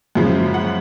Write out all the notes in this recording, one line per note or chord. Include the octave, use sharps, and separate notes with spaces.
F#2 C#3 F3 G#3
F#5